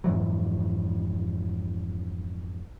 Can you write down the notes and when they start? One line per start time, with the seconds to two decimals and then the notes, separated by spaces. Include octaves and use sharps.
0.04 F2 G#2 E3 F#3